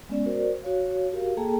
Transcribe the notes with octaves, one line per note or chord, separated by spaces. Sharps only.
G#3 B3 C#4 D5
F#4 A#4 C5 D5
F#4 C#5 F5
F#4 G4 A#4 F5
A#3 G#4 A4 G5 A5 A#5